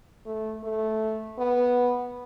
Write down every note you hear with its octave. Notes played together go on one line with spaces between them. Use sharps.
A3
A3
B3